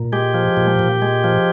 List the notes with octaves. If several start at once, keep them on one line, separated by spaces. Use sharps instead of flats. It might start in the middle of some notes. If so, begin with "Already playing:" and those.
Already playing: A#2
G#3 G4
F3
A#2
A#2
G#3
F3